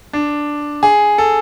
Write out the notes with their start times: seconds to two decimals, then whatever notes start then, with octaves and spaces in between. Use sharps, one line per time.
0.13 D4
0.83 G#4
1.18 A4